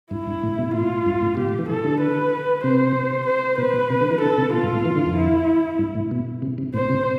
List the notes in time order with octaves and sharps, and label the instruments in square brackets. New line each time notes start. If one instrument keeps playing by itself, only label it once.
[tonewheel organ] G2 [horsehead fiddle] E4
[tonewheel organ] G2
A2
B2
[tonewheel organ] A2 [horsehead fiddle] F4
[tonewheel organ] G2
A2
[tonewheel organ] B2 [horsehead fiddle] G4
[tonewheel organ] A2
E3
[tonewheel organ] E3 [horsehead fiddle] A4
[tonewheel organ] D3
[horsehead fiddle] B4
[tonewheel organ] C3 [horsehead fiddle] C5
[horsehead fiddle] C5
[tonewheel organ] B2 [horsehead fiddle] B4
[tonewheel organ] B2
C3
D3
E3
[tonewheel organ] D3 [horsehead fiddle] A4
[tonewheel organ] C3
[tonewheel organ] B2 [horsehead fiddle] F4
[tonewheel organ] G2
A2
E3
D3
F2
[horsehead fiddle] E4
[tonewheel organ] G2
A2
B2
C3
C3
[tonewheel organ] A2 [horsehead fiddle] C5
[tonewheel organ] C3